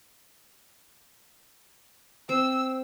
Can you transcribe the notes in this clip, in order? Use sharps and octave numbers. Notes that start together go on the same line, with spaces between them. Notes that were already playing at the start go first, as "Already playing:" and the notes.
C4 E6